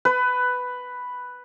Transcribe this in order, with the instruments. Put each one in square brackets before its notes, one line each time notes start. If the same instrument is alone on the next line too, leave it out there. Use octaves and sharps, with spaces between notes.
[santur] B4